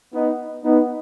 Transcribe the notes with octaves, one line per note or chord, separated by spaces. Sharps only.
B3 D#4
B3 D#4